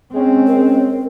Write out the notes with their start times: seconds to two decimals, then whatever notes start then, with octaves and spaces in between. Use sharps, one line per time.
0.13 G#3 C4 C#4
0.47 A#4